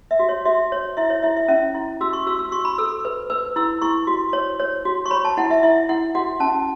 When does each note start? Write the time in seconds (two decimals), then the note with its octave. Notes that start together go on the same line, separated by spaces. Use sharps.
0.11 E5
0.19 F#4
0.29 C#5
0.45 F#4 E5
0.72 C#5
0.97 E4 E5
1.10 C#5
1.22 E4 E5
1.37 E5
1.48 C#4 E5
1.75 E4
2.01 F#4 E6
2.13 C#6
2.27 F#4 E6
2.39 E6
2.52 F#4 C#6
2.65 B5
2.78 A4 E6
3.05 B4
3.30 B4 E6
3.56 E4 E6
3.82 E4 C#6
4.07 F#4
4.33 C#5
4.60 C#5
4.85 F#4
5.06 C#6
5.11 C#5 B5
5.25 A5
5.37 E4 F#5
5.50 E5
5.63 E4 E5
5.89 E4 F#5
6.15 F#4 F#5
6.40 C#4 A5